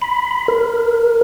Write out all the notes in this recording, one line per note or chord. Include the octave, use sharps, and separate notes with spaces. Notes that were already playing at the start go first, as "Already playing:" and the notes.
B5
A#4